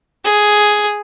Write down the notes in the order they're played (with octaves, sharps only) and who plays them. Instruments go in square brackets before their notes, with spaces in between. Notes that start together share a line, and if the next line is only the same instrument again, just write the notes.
[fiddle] G#4